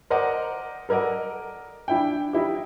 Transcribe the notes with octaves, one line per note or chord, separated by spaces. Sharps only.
A#4 C5 D5 D#5 F#5 A#5
A4 A#4 D5 D#5 F#5
D4 E4 G5
D#4 E4 G4